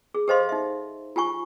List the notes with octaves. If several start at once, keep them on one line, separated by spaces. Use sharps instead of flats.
G#4
G4 A4 C5 D#5 F5 C6
D#4 E5
F4 G4 G#5 C#6